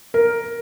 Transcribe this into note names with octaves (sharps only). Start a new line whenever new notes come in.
A#4